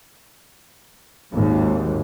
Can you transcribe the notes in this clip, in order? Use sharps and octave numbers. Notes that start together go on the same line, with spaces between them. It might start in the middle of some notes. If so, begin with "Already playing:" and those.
G#1 D#2 G#2